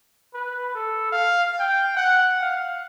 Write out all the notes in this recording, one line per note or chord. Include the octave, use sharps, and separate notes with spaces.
B4
A4
F5
G5
F#5
F5